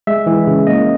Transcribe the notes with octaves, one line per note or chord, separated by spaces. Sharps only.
G#3 E5
E3
C#3
A#3 D#5